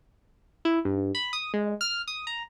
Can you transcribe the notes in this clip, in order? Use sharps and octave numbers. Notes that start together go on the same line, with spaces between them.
E4
G2
B5
D#6
G#3
F6
D#6
A#5